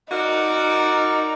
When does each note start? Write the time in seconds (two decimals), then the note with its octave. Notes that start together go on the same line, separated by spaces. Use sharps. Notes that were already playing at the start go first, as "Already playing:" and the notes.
0.11 D#4 F#4 A#4 D5